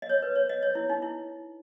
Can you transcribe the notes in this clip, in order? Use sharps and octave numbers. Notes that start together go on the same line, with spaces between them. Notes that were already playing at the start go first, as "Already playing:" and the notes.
D#5
C#5
B4
C#5
D#5
C#5
E4
D#4
E4